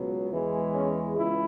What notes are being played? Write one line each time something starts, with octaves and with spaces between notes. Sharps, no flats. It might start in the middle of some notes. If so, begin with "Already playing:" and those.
Already playing: C#2 B2 F#3
E2 E3 G#3
C#4
C#2 E4